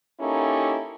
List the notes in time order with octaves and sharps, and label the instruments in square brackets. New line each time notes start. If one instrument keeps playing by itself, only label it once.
[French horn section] A#3 C#4 D#4 E4 G4 A4